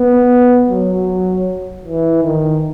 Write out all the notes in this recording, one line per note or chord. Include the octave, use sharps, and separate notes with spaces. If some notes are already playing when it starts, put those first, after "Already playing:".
Already playing: B3
F#3
E3
D#3